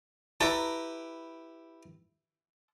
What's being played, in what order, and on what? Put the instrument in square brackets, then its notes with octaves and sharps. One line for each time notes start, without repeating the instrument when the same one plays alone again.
[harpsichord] E4 G4 B4 [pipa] A4 A#5